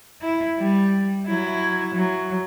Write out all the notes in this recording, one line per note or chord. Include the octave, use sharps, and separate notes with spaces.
E4
G3
F#3 E4
F#3